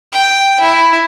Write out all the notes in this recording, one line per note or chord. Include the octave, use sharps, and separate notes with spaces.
G5
E4